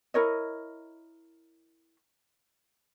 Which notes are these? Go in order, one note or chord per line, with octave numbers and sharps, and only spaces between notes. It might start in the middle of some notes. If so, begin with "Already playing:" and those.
E4 A#4 C#5 D#5